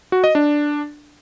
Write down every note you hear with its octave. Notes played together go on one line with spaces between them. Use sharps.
F#4
D#5
D4